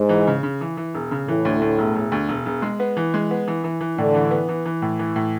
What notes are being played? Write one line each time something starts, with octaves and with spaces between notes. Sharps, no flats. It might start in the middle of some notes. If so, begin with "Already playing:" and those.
Already playing: G#2
E3
C#3
C#3
E3
E3
E1
C#3
A2 E3
D2
D2
E1
E1
D2
E1
E1
G#3
B3
E3
G#3
B3
E3
E3
E3
A2 D3
E3
B3
E3
E3
A2
E3
A2